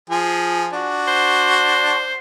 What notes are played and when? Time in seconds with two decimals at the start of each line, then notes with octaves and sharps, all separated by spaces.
0.10 F3 G#4
0.73 D4 F#4
1.08 C5